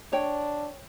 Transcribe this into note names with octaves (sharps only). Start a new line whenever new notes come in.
D4 C#5 G5